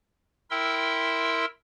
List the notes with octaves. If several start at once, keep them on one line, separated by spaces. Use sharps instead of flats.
E4 A#4 E5 G5 C6 E6